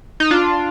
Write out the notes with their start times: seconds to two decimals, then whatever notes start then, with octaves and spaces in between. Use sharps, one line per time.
0.20 D#4
0.31 D4 F4